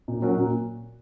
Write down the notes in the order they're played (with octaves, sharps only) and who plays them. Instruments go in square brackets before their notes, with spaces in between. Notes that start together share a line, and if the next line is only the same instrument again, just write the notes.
[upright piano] A#2
F#3 C#4 F#4 A#4
A#2